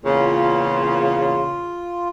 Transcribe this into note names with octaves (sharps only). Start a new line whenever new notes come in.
E2 A#2 C#3 F4